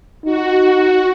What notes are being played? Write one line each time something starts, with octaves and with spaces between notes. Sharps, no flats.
D#4 F#4